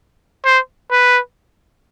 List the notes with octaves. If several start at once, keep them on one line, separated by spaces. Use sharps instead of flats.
C5
B4